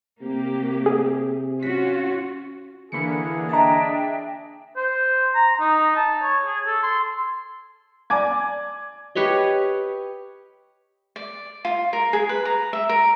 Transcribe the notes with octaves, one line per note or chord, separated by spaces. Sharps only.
C3 A#3 G4
G#4
C#4 F4 F#4 B6
D3 E3 A#3 G#4 B5 C#7
D4 D#5 E5 G5 A5 A#5
C5
A#5
D#4
A5
C#5
G#4
A4
C6
D5 G#5 D6 G#6
G4 B4 C#5 D#5
D5
F4
A#4
G#4
B4
A#5
E5
A#4